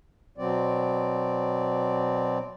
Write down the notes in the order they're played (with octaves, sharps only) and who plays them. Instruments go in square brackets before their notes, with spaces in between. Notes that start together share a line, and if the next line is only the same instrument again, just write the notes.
[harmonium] B2 F#3 C4 D5